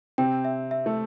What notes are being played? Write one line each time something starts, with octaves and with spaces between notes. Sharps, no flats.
C3 C4 G5
E5
E5
A3